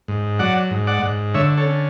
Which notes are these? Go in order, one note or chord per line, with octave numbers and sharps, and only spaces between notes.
G#2
F#3 D5 F#5
G#2
D5 F#5
G#2
D3 C#5 E5
A4 C#5
C#4